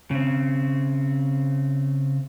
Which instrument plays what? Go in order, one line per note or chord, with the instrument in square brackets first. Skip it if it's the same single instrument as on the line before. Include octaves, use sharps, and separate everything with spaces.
[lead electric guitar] C#3 C4